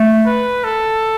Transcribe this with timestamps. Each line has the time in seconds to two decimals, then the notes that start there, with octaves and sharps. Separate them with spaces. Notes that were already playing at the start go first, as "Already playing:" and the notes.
Already playing: A3
0.26 B4
0.64 A4